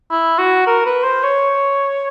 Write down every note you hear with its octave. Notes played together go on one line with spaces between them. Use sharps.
E4
F#4
A#4
B4
C5
C#5